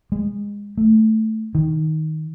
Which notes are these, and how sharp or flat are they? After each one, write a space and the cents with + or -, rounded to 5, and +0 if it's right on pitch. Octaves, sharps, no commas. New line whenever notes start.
G#3 -25
A3 +0
D#3 +10